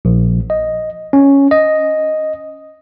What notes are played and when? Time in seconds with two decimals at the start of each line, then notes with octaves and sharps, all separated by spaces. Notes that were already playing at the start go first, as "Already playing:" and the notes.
0.05 A#1
0.50 D#5
1.13 C#4
1.51 D#5